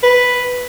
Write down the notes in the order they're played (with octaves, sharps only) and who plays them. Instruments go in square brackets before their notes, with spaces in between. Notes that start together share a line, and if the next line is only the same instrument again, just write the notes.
[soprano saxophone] B4